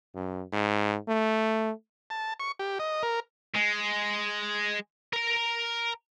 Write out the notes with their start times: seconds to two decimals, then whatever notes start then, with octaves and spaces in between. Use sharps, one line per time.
0.15 F#2
0.52 G#2
1.08 A3
2.10 A5
2.40 C#6
2.59 G4
2.79 D#5
3.03 A#4
3.55 G#3
5.13 A#4 A#5